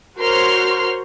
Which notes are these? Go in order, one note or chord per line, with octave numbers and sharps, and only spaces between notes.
F#4 A#4 C5 C#5 C6 F6